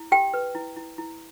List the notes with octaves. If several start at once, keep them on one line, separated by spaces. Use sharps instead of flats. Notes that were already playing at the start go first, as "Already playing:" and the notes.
Already playing: E4
G4 G5
B4
E4
E4
E4